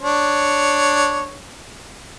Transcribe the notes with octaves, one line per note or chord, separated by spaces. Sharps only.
D4 C#5